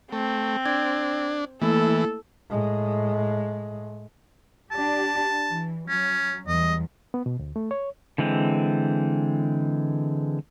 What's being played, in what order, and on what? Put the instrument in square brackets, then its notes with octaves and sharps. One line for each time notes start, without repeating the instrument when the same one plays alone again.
[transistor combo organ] A3 [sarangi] C4
[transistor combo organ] D4 [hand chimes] G#6
[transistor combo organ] E3 [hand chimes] A3 A#3 E4 [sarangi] A4
[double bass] A2 G#3
[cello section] D4 G4 [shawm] A5
[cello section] E3
[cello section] F#3 [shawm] C#4
[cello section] E2 G3 [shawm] D#5
[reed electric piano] B3
B2
D2
A3
C#5
[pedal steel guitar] D3 E3 G#3 C4